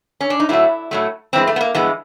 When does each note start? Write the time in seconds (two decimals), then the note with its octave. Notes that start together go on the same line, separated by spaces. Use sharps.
0.21 C#4
0.30 D4
0.40 D#4
0.49 A2 F#3 A3 E4
0.91 A2 F#3 A3
1.33 G2 E3 G#3 C4
1.47 A3
1.56 B3
1.61 A#3
1.74 G2 E3 G#3 B3